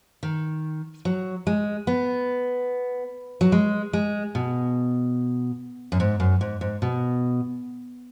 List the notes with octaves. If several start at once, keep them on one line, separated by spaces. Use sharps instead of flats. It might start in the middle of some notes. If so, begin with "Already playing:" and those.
D#3
F#3
G#3
B3
F#3
G#3
G#3
B2
F#2
G#2
F#2
G#2
G#2
B2